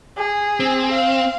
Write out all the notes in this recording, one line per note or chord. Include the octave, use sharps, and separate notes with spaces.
G#4
C4
F5